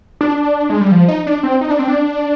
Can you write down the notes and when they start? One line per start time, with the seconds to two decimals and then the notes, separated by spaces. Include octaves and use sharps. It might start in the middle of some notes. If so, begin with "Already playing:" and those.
0.21 D4
0.70 G#3
0.81 G3
0.92 F3
1.08 D#4
1.27 D4
1.43 C4
1.61 D#4
1.70 D4
1.79 C4
1.88 D4